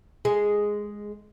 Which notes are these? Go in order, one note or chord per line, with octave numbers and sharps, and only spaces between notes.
G#3 G#4